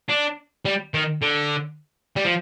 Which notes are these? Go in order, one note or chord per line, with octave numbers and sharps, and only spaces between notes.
D4
G3
D#3
D3
G3
F3